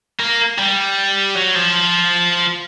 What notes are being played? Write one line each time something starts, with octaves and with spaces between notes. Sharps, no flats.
A#3
G3
F#3
F3